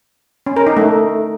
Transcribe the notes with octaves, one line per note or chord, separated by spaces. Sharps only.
C#4
A#4
D#4
A3